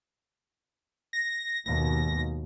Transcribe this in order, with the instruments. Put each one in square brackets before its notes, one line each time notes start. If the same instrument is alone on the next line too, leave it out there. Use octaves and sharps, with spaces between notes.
[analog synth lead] A#6
[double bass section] D#2 G#2 B2 [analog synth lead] A#6